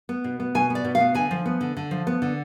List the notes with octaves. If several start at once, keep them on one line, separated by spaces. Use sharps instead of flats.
B3
B2
B3
B2 G#5
B3
D5
B2
F5
B3
D3 G#5
F3
B3
D3
D3
F3
B3
D3